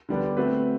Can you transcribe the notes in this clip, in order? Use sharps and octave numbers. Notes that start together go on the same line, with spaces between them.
D3 G3 B3 D4
A3 C4 F#4 B4